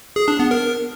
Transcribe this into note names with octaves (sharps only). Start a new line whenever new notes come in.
G#4
D4
B3
A#4